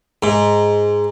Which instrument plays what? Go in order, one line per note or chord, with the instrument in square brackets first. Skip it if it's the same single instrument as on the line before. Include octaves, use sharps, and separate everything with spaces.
[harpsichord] G#2